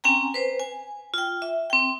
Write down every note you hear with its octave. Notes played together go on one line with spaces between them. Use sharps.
C4 C#4 G5 G#5 A#5
B4 C5
G#5
F4 G5
E5
C4 G5